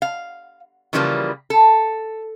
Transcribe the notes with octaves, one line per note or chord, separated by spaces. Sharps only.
F5
C#3 E3 F3 G3 A3 A#3
A4